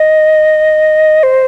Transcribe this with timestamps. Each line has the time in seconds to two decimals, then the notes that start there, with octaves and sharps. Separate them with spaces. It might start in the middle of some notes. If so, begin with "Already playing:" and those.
Already playing: D#5
1.23 C5